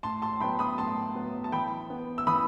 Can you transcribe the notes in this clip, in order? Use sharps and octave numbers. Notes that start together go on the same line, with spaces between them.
A2 A5 C6
A5 C6
F#3 B3 G5 B5
B5 D#6
A2 A5 C6
F#3 B3
A5
E3 G5 B5
B3
E6
E3 B5 D#6